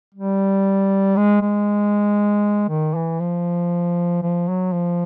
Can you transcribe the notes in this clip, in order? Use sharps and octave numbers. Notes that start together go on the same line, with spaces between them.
G3
G#3
G#3
D#3
E3
F3
F3
F#3
F3